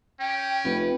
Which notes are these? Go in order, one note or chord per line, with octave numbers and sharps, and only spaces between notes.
C#4 G5
F1 B4